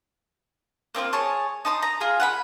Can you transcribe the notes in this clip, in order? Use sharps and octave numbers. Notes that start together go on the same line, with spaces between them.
A#3 C4 D4 F4
G#4 C#5 A5
D#4 A5 C6 D#6
A#5
F4 G#4
F#5 G#5 B5